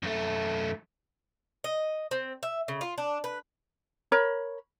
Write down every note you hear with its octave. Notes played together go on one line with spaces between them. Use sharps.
F#2 A3
D#5
C4
E5
C#3
F4
D4
B4
A#4 C#5 B5